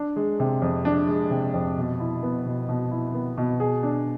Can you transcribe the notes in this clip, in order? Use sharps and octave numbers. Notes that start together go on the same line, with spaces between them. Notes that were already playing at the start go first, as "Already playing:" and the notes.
Already playing: D4
G#3
C3
F2
D4
G#3
C3
F2
B2
E4
B3
B2
B2
E4
B3
B2
G#4
D4